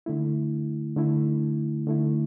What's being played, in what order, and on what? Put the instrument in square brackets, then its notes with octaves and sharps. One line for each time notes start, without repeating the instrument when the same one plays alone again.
[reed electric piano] D3 A3 E4
D3 A3 E4
D3 A3 E4